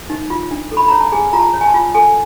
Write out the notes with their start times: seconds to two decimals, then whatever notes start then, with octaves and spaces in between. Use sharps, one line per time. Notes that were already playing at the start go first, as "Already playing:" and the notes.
0.10 D#4
0.30 F4
0.51 D4
0.71 A4
0.77 B5
0.88 C#5 A#5
1.01 A5
1.12 G#4 G#5
1.33 F4 A#5
1.39 A5
1.53 C#5
1.61 G#5
1.67 A5
1.74 F4
1.95 A4 G#5